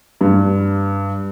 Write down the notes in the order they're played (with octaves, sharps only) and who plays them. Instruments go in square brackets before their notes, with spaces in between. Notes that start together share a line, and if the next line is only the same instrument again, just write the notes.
[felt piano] G2